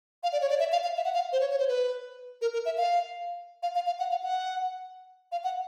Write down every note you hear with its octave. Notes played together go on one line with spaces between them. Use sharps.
F5
D5
C#5
D5
E5
F5
F5
E5
F#5
F5
C5
C#5
C#5
C5
B4
A#4
A#4
E5
F5
F5
F5
F5
F#5
F5
F#5
F5
F#5